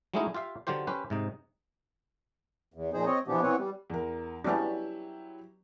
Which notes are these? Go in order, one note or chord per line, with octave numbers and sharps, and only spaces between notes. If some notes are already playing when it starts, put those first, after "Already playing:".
F#3 G#3 A3 C#4 D#4 E4
F4 G4 E5 F5
D3 F#3 F4 G4 C5
C#4 G4 B4 C5
G#2 C3 D#4
E2
A#2 F3 D#4 G#4 C5
C4 C#5 D#5
B2 E3 F3 B3 D4 G4
E3 B3 C4 B4 C#5
G3
E2 A#4
F#3 B3 C#4 D4 E4 G4